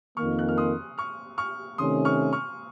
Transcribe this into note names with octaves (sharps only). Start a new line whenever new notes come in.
F2 D#3 A#3 C#6 F6
F#6
F6
C6 D#6
C#6 F6
C#6 F6
C3 D#3 A3 C#4 C6 D#6
C#6 F6
C#6 F6